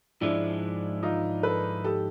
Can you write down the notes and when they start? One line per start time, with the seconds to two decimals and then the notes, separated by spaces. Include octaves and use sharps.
0.21 G#2 F3 G#3 D4 E4
1.03 D#4 F4
1.43 A4 B4
1.84 G4 A4